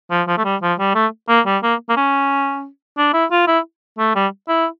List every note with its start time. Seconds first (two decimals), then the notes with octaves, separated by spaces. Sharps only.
0.11 F3
0.27 F3
0.38 A3
0.44 G3
0.62 F3
0.79 G3
0.95 A3
1.29 A#3
1.46 G3
1.63 A#3
1.89 A#3
1.96 C#4
2.98 D4
3.13 E4
3.31 F4
3.47 E4
3.99 A3
4.15 G3
4.48 E4